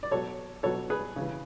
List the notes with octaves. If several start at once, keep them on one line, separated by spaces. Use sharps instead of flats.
D5
B2 F#3 A4 C#5
B2 F#3 A4 C#5
G#4 B4
C#3 E3